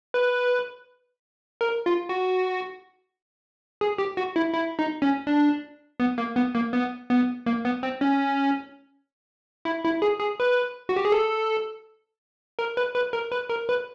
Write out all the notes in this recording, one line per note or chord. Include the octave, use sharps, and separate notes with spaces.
B4
A#4
F4
F#4
G#4
G4
F#4
E4
E4
D#4
C#4
D4
B3
A#3
B3
A#3
B3
B3
A#3
B3
C4
C#4
E4
E4
G#4
G#4
B4
F#4
G4
G#4
A4
A#4
B4
B4
A#4
B4
A#4
B4